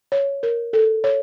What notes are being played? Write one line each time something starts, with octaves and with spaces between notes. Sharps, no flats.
C#5
A#4
A4
C#5